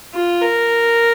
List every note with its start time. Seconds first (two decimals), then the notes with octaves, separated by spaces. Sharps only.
0.14 F4
0.42 A#4